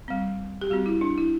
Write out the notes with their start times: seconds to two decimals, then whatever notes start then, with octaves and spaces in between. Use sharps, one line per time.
0.08 G3 C4
0.61 G4
0.70 G3 C4 F#4
0.86 E4
1.01 D4
1.18 E4